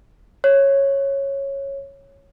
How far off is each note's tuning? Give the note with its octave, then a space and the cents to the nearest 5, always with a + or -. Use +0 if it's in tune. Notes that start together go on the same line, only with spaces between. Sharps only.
C#5 -10